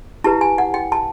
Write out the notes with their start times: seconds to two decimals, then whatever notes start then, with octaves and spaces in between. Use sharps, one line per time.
0.24 E4 G4 B4 A5
0.41 G#5
0.58 F#5
0.74 G5
0.92 A5